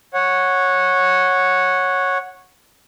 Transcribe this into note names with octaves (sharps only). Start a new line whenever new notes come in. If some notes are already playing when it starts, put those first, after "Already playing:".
C#5 F#5